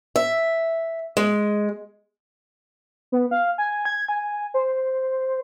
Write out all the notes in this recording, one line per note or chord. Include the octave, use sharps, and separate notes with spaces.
E5
G#3
B3
F5
G#5
G#6
G#5
C5